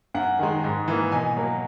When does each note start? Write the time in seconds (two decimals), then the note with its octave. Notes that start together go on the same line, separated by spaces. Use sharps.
0.15 F#2 F#5
0.39 D#3 G#3
0.64 G#2
0.88 E3 A#3
1.12 B2 G#5
1.37 F#3 A#3